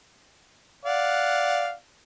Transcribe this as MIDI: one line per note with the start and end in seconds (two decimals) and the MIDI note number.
0.85 1.72 74
0.85 1.72 77
0.85 1.72 78